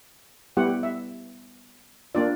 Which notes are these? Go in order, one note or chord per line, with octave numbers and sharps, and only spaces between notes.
G3 B3 E4 G4 F#5
E5
A#3 D4 F4 D5